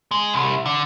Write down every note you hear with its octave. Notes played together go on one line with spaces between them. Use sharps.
G#3
C2
D3